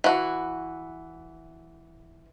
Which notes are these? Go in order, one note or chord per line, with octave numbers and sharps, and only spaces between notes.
E3 F#4